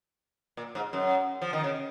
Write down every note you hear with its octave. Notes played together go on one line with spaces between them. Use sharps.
A#2
G#2
F#2
F3
D#3
C#3